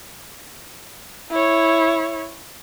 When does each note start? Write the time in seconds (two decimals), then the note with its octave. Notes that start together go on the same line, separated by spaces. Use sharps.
1.31 E4 C#5